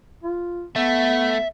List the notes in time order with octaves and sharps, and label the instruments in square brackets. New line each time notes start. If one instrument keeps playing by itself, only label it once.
[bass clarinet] F4
[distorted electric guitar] A3 [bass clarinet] B3 [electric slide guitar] E5